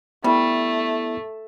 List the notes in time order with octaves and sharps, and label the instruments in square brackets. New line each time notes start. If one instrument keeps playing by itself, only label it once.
[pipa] G3 [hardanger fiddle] A3 [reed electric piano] B3 E4